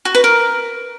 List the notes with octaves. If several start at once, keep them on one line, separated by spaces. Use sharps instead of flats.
F#4
B4
A#4